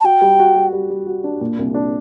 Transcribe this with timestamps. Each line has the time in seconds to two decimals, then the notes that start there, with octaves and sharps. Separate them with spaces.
0.01 A5
0.04 F#4 G5
0.21 G3
0.39 F#4
0.55 G3
0.72 G3
0.90 G3
1.07 F#4
1.24 D4
1.41 A#2
1.59 C2
1.74 D4